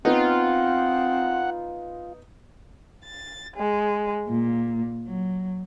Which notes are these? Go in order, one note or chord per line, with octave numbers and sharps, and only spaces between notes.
B3 C4 D#4 F4 F#5
A6
G#3
A#2
F#3